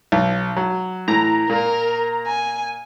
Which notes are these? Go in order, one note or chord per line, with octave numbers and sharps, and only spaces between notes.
B1
F#3
A2 E3 A#5
A#2 A#3 A#4
G#5